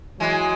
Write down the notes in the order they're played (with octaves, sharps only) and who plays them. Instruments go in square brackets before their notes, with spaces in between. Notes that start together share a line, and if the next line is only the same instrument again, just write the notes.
[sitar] E3 G#3 [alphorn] F#3